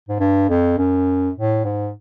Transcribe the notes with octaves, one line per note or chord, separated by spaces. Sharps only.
G#2
G2
F2
F#2
A2
G#2